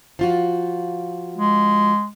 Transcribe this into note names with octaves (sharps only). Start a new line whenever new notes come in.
F3 F4 F#4
G#3